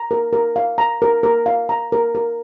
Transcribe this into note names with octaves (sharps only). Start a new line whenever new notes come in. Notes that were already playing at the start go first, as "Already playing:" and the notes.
Already playing: A#5
A#4
A#4
F5
A#5
A#4
A#4
F5
A#5
A#4
A#4